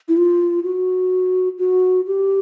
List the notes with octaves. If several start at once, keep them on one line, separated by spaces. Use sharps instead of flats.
E4
F4
F#4
F#4
G4